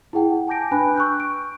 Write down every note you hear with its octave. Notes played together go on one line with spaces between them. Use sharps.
E4 G#4 F#5 G5
G#5 A5 D6 G6 A#6 D7
D4 B4 G5 G#5 B5 F#6
C#6 E6 F#6 G6
D7